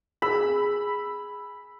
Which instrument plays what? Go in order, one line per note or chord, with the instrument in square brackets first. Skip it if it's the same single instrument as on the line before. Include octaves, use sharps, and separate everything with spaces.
[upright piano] G#4 E6 [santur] B5